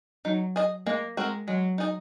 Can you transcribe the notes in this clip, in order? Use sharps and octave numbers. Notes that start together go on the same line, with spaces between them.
F#3 D#4
G#4 D#5
G#3 A#3
G#3 C4 F#4 A#4
F#3 G#3
D#4 G#4 D#5